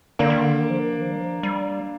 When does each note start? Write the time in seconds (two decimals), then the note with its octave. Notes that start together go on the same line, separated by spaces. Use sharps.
0.19 D3 A#3 D4
0.30 D#3
0.41 D3
0.60 D#3
0.70 F3
0.79 D#3
1.01 F3
1.12 G3
1.20 F3
1.43 G3